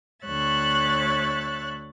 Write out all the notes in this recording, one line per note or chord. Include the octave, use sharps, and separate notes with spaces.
D2 C#5 E5 F#6 A6